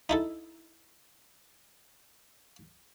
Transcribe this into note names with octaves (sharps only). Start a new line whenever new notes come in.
D#4 E4 A4